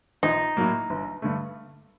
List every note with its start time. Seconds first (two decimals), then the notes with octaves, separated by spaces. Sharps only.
0.23 A#1 D#4
0.57 A2 F#3 A#3
0.90 G1
1.22 G2 D3 A3